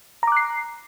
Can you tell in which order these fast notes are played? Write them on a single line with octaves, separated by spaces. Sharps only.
A#5 D6 F#6 C7